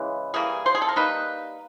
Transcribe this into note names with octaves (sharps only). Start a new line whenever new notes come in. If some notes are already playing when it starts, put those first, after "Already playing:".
Already playing: C#3 E3 G#3
E3 G3 A#3 G#4
C5
G#4
A4
A#4
G3 A#3 D#4 B4